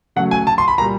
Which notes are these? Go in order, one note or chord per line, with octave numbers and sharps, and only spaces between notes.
C#3 F#3 A3 F#5
G#5
A5
C6
B5
A#2 G3 A#5